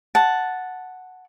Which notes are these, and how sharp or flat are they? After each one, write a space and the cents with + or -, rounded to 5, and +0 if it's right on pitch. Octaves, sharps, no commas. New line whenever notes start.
F#5 +0 A5 +0